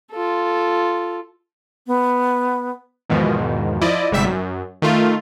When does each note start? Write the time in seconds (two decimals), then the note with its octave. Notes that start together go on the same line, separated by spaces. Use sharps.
0.12 F4 A4
1.87 B3
3.10 E2 G#2 B2 D#3 F3
3.81 F3 E4 D5 D#5
4.11 G1 G#2 C3 G3 E5 B6
4.24 F#2
4.82 D#3 A3 F4